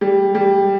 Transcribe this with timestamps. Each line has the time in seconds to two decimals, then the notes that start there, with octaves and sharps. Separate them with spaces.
0.01 G3
0.35 G3